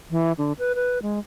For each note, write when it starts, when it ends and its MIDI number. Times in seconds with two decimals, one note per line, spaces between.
0.11 0.32 52
0.38 0.53 50
0.59 0.73 71
0.75 0.99 71
1.02 1.19 56